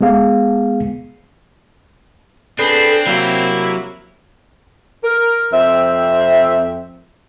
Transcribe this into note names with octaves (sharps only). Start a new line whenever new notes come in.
G#3 B3 G#4 F5
C4 D4 G#4 A4 B4
C3 F#3 A#3 E4
A#4
F2 C4 E5